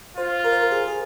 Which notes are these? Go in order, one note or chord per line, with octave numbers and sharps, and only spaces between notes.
F4 C5
A#4
C5
A#4
G#4
G#4